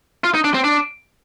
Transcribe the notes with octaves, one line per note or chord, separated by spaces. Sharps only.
F4
D#4
D4
C4
D4